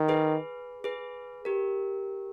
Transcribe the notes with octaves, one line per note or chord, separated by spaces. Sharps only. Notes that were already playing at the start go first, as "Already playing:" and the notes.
Already playing: D#3
G#4 B4
G#4 B4
G4 A#4